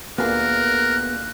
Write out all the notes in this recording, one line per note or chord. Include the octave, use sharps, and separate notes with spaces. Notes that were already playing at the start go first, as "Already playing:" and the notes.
D2 A#2 B3 G#4 A#4 F#6